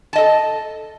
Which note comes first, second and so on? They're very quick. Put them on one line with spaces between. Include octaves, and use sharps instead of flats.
A5 D#5 A4